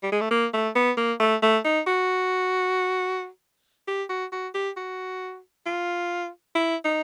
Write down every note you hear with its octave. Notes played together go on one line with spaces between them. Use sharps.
G3
G#3
A3
A#3
A3
B3
A#3
A3
A3
D#4
F#4
G4
F#4
F#4
G4
F#4
F4
E4
D#4